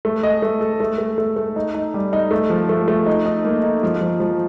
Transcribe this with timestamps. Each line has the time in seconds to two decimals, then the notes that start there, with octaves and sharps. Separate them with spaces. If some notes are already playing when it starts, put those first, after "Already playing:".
0.05 A3
0.23 D#5
0.42 A3
0.61 A4
0.80 A3
0.98 A3
1.18 A3
1.36 A3
1.56 D#4
1.75 D#4
1.94 G3
2.13 D#4
2.31 A3
2.50 F3
2.69 A3
2.88 A3
3.06 D#4
3.26 D#4
3.45 A#3
3.64 D#4
3.83 F3
4.01 F3
4.20 F3